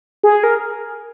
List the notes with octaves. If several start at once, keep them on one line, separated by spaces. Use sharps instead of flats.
G#4
A#4